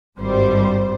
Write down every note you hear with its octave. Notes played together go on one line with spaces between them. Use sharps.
G#1 G2 G3 C5